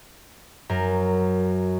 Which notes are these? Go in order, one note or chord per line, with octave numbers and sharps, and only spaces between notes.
F#2 A#4